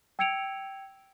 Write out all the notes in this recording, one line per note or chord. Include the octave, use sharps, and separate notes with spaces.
G5 E6 G#6 C#7 D7 F7